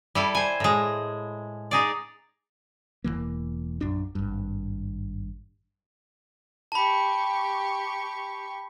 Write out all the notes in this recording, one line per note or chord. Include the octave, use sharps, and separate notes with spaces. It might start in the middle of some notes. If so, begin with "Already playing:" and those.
G3 E4 A4
C5 G#5
A2 G#3
D#4 G#4 D5
E1 E2 E3 A#3
A#1 F#2 D4
G#1 G2
G4 A5 B5 C#6